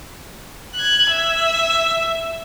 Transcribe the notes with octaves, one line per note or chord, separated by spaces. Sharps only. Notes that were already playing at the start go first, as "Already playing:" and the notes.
F#6 G#6
E5